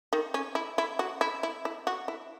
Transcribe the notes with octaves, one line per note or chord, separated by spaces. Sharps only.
D#3
C#4
E4
E4
F#4
E4
E4
E4
F#4
E4